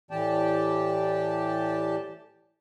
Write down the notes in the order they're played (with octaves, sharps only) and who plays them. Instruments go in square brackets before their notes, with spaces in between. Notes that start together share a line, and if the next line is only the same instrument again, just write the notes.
[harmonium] A2 E3 G4 D5 G5 A5